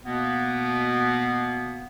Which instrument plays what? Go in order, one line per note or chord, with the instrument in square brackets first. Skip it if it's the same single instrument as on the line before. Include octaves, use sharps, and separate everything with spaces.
[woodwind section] B2 A#3 B3